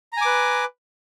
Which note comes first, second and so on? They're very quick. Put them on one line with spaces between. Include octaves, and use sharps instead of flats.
A#5 G#5 D6 B4